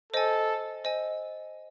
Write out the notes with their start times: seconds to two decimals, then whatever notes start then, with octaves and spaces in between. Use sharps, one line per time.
0.12 A4 C5 D#5 G#5
0.84 C5 D#5 G#5